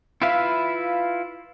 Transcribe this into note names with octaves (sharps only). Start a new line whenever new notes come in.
E4 F4 B4 E5 F5